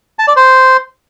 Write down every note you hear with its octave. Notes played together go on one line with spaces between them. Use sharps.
A5
D5
C5